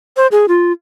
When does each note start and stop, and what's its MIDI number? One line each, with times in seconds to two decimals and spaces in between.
0.17 0.27 72
0.32 0.46 68
0.48 0.72 65